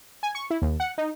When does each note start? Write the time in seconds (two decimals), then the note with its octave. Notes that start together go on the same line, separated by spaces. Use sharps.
0.23 G#5
0.35 C#6
0.50 E4
0.62 D#2
0.80 F#5
0.98 D#4